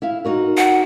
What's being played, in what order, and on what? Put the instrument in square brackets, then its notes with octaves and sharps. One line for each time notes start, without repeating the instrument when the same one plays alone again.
[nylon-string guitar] E4 E5 F5
D#4 F#4 A#4
[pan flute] F#5